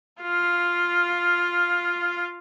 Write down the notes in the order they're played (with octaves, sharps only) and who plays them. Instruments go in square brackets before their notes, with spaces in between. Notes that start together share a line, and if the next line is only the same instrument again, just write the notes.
[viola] F4 F5